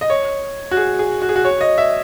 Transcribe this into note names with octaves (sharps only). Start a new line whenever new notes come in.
D#5
C#5
F#4
G#4
G#4
F#4
G#4
F#4
C#5
D#5
E5